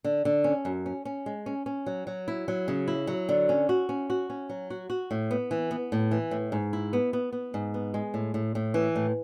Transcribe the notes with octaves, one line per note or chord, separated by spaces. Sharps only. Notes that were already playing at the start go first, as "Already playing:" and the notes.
D3
D3
C#4
F#2
C#4
C#4
G#3
C#4
C#4
F#3
F#3
E4
F#3
C#3
E4
F#3
D3
C#4
F#4
C#4
F#4
C#4
F#3
F#4
F#4
A2
B3
E3
B3
A2
E3
A2
G#2
E4
B3
B3
B3
G#2
B3
G#3
A2
A2
A2
E3
A2